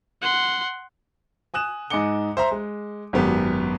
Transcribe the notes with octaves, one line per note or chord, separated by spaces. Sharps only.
F#5 C6
G#5 D#6 F#6 E7
G#2 D#5 G#5 D6 C#7 G7
C5 E5 A#5 C6
G#3
G#1 F#2 B3 G4